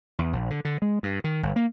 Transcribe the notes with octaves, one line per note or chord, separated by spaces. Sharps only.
E2
A#1
D3
D3
G#3
G2
D#3
G1
A#3